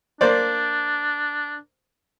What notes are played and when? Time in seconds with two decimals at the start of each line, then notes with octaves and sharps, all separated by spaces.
0.21 A#3 D4 C5 D5